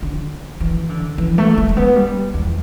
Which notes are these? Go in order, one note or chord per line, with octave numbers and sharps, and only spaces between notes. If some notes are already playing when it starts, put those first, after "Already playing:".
D3
E3
D3
E3
A3
A3
A3
B3
G3
E2